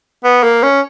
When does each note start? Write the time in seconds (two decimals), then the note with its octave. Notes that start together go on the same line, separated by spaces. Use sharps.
0.24 B3
0.43 A#3
0.63 C#4